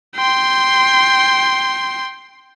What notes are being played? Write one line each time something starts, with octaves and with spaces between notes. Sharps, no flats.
G5 C6